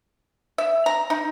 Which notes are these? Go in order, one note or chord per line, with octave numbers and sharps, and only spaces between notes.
E5
A#5
D#4